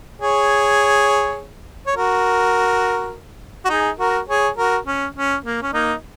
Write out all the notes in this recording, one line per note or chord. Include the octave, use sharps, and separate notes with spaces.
G#4 C#5
C#5
F#4 A#4
F#4
D#4 G#4
F#4 A#4
G#4 C#5
F#4 A#4
C#4
C#4
A#3
C#4
A#3 D#4